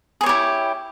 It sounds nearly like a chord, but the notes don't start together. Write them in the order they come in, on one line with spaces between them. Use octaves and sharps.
G#4 C#5 G4 E4